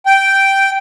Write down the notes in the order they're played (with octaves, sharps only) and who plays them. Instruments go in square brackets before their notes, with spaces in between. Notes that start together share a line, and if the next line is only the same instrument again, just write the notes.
[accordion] G5